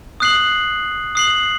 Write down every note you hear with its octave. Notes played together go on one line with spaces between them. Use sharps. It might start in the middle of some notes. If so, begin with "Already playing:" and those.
D#6 F#6 C7 F#7
D#6 F#6 C7 F#7